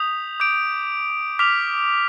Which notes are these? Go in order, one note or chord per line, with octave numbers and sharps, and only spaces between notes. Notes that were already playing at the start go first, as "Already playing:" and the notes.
Already playing: D#6 G6 B6 F7
D6 G6 D7
D6 F6 B6 F7